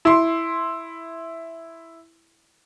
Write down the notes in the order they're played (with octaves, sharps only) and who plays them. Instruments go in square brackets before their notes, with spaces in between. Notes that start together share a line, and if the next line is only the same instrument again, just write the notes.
[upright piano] E4 C6